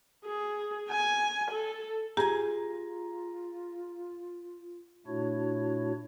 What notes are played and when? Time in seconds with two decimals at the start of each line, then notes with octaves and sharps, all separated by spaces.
0.25 G#4
0.89 G#5
1.50 A4
2.17 F4 G4 G#4 G#5 A#5
5.07 A#2 A3 D4 E4 F#4 C#5